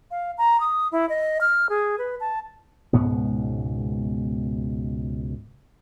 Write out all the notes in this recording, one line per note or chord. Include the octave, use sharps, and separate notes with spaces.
F5
A#5
D#6
E4
D#5
F6
G#4
B4
A5
C#2 G#2 B2 B3